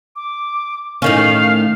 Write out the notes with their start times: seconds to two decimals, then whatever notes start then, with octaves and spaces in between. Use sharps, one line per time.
0.16 D6
1.02 A2 D#3 C#4 F5